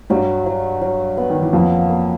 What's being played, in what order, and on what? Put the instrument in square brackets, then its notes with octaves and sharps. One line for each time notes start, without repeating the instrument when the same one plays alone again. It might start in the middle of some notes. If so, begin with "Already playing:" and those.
[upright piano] G2 G3 [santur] F#3
[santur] F#3
F#3
B3
[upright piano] D#3
E3
[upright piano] F2 F3 [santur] A#3
[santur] A#3